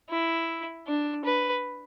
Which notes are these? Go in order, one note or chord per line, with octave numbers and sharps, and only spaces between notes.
E4
D4
B4